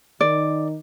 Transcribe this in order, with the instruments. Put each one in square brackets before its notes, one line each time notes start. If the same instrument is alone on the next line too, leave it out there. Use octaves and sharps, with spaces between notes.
[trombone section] D#3 D#4 [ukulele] D5